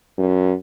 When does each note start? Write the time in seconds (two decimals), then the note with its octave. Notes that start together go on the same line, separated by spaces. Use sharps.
0.18 F#2